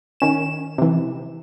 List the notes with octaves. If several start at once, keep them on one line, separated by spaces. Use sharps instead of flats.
D#3 C#4 E7
C3 E3